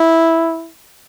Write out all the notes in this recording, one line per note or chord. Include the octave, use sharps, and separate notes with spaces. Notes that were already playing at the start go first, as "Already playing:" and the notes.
Already playing: E4